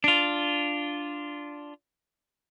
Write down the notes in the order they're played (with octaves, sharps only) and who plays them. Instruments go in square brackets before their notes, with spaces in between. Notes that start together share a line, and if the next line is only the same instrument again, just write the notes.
[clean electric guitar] D4 F4